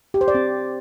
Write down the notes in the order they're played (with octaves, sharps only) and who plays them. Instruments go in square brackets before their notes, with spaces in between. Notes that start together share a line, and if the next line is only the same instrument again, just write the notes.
[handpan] G4
C5
D5
C4